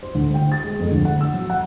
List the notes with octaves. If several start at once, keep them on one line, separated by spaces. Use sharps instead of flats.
C5
D2
G5
A6
G#3
F2
D2
F#5
E6
F#3
F#5